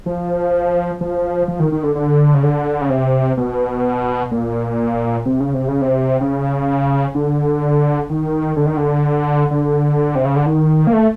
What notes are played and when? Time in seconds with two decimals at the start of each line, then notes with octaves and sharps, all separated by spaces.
0.06 F3
1.01 F3
1.48 F3
1.60 D#3
1.72 D#3
1.83 D3
1.95 D3
2.34 C#3
2.43 D3
2.81 C#3
2.90 C3
3.37 B2
4.31 A#2
5.26 C3
5.40 C#3
5.54 C3
5.68 C#3
5.81 C3
6.21 C#3
7.15 D3
8.10 D#3
8.56 D3
8.66 D#3
8.77 D3
9.51 D3
10.15 C3
10.25 C#3
10.36 D3
10.46 D#3
10.87 A#3
10.93 A3